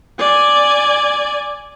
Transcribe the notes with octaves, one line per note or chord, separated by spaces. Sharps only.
D5 G#5